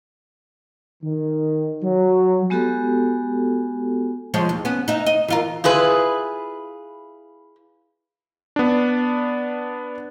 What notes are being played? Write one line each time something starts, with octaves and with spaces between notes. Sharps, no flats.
D#3
F#3
G#3 B3 F#4 G4 A4
F3 G#3 C#5
D#2
B3 C#4
D#4 E5
D#5
E3 F4 A#4
E4 F4 G#4 B4
B3 D4